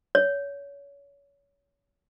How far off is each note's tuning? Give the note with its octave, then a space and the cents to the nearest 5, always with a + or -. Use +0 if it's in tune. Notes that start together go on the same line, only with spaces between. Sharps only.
C#5 +30